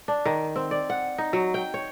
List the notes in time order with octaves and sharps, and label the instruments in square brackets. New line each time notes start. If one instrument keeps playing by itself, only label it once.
[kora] D4
D#3
C4
D5
F#5
D#4
F#3
G5
C#5